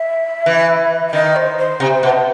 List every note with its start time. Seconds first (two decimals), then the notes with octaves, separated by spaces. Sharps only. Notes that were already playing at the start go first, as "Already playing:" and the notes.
Already playing: E5
0.46 E3
1.08 E5
1.13 D#3 D#5
1.36 C5
1.58 C5
1.80 C3
2.03 B2